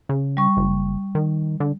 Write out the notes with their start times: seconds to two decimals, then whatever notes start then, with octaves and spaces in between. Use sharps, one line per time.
0.09 C#3
0.37 G3 C#6
0.57 F#1
1.15 D#3
1.60 D3